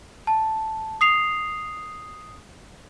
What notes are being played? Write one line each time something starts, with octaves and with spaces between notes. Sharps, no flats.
A5
D#6 C7 F7